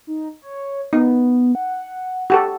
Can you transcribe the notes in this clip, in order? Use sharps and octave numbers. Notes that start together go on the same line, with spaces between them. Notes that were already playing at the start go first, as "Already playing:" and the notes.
D#4
C#5
B3 D#4
F#5
F#4 G4 A4